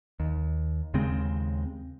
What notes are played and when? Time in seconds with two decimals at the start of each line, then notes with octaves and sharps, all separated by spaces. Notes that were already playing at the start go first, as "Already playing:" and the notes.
0.20 D#2
0.94 D#2 C#3 G#3 C4